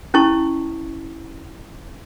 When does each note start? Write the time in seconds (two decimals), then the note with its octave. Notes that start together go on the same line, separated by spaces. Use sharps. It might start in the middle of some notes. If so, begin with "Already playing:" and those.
0.14 C#4 E4 A5 C#6